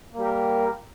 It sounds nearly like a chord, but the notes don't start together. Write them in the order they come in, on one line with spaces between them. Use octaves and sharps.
A#3 G3 G4 A#4